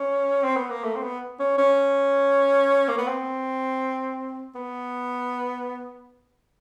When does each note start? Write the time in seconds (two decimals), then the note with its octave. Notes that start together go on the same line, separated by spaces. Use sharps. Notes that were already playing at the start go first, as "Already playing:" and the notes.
Already playing: C#4
0.43 C4
0.56 B3
0.69 A#3
0.83 A3
0.95 C4
1.02 B3
1.39 C#4
1.58 C#4
2.88 A#3
2.98 B3
3.07 C4
4.55 B3